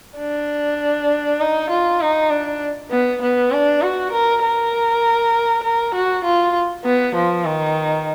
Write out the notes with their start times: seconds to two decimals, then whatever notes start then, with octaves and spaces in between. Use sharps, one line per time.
0.18 D4
1.40 D#4
1.70 F4
2.01 D#4
2.30 D4
2.91 B3
3.22 B3
3.52 D4
3.82 F#4
4.12 A#4
4.42 A#4
5.63 A#4
5.94 F#4
6.24 F4
6.84 B3
7.15 F3
7.45 D#3